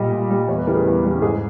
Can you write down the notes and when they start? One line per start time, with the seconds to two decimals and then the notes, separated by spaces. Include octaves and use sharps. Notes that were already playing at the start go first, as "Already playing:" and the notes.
Already playing: A#2 G3 D#5
0.12 A#2
0.30 G3
0.48 E2 C#5
0.58 B4
0.67 C#3 E3 G3 A#4
0.76 G#4
0.86 E2
1.04 C#3 E3 G3
1.22 G#2 G#4